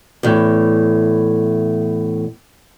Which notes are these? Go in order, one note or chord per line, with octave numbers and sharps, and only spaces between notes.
E2 A2